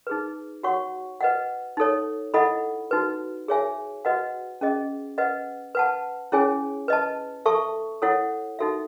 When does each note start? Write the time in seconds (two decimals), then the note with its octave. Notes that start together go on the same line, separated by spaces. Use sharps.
0.07 D#4 G#4 B4
0.63 F#4 C#5 F#5 C#6
1.21 B4 D#5 F#5
1.77 D#4 A4 C#5
2.34 E4 A4 D#5 F#5 B5
2.91 D#4 F#4 B4
3.48 G#4 C#5 E5 G#5
4.05 F#4 B4 D#5 F#5
4.61 C#4 G#4 D#5
5.18 B4 D#5 F#5
5.75 B4 F#5 A5
6.32 C#4 E4 G#4 C#5 G#5
6.88 B4 D#5 A5
7.46 A4 E5 A5 C#6
8.02 E4 A4 C#5 F#5
8.59 D#4 F#4 A4 E5